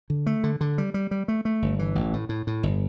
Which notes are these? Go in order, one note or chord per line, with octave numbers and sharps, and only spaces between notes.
D3
A3
D3
D3
G3
G3
G3
A3
A3
G1
E3
A1
A2
A2
A2
G1